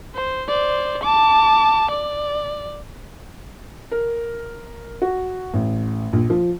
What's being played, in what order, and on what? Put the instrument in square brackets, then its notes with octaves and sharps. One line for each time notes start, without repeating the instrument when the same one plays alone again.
[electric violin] C5
C5 D5
A5 D6
D5
[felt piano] A#4
F#4
A1
A#1
F3